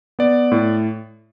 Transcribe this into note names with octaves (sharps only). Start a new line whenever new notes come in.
B3 D5
A2